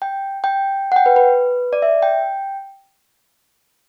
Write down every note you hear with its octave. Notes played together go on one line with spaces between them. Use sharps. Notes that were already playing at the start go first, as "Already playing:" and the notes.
G5
G5
F#5
G5
B4
B4
D5
E5
G5